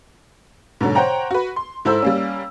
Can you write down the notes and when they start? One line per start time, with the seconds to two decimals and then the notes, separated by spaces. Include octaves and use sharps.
0.81 G#2 B2 D3 F#3
0.95 C5 C#5 F#5 G5 A#5
1.31 F#4 B4
1.56 C6
1.85 G#2 E4 A4 C5 E6
2.02 G3 A#3 C#4